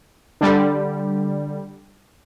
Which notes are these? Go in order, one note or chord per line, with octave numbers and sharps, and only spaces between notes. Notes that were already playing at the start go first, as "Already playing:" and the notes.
D3 G3